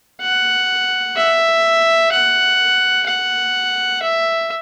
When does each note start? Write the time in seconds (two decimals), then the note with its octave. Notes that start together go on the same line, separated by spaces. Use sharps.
0.21 F#5
1.16 E5
2.12 F#5
3.07 F#5
4.02 E5